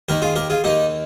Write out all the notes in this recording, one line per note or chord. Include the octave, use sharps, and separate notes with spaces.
D#2 D#3 G4 A#4
F4 G#4
G4 A#4
F4 G#4
D#2 D#3 D#4 G4